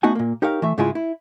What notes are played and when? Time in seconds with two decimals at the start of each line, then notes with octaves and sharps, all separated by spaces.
0.03 A3 B3 D#4 F#4 F#5 G#5
0.15 A#2 A#3
0.42 D#4 G4 A#4 C#5 F5
0.62 E3 A3 E5
0.78 G#2 C#3 G#3 E4 F4 G#4
0.95 E4